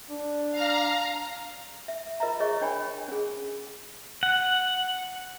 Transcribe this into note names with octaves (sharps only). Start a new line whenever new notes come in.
D4
F5 A#5
E5
F4 A#4 D#5 E5 A#5
G#4 C#5 D#5 C#6
D4 C#5 G5 G#5 B5
C#4 G#4
F#5